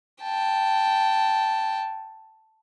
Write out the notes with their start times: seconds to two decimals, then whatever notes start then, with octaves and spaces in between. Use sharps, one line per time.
0.23 G5 A5